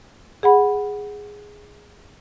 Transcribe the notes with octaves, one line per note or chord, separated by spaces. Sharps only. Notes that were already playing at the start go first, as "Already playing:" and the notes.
G#4 F#5 B5